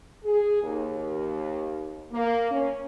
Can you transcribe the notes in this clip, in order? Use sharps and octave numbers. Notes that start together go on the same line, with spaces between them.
G#4
D#2
A#3
C#4